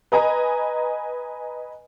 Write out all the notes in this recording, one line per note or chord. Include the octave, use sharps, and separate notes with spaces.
B4 D#5 G#5 A#5